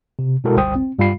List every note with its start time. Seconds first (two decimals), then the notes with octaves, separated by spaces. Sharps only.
0.19 C3
0.44 B2 G#3 E4 F#4 A4 A#4
0.57 G1 C#2 G3 C5 G5 D#6
0.75 C4
0.99 G2 G3 F4 F5 B5 C7